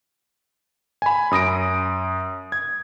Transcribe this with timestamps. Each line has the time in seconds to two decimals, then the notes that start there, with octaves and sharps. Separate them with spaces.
1.02 G#5 B5
1.31 F#2 D#6 A#6 D7
2.52 G#6